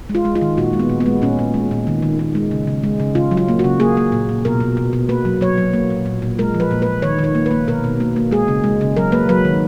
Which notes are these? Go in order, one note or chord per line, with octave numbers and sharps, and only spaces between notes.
G#3
F4
G#3
F4
D#3
A#2 F#4
G#3
B3
A#2
B3
G#3
A#2 C#4
A#2
G#3
A#2
D#3
D#3
D#3
G#3
C#3
C#3
G#3
C#3
C#3 F4
F#3
F4
A#3
F#4
C#3
A#3 G#4
A#3
A#2
A#2
B2 A#4
B2
B2
B2
A#3 B4
F#3
F#3 C#5
F#3
A#3
A#2
A#2
A#2
G#3 A#4
F3
B4
A#2
B4
A#2
D#3 C#5
D#3
C#5
A#3
B4
A#3
B2 A#4
B2
A#3
A#3
G#3 G#4
C#3
G#3
C#3
F#3 A#4
A#3 B4
F#3 B4
D#3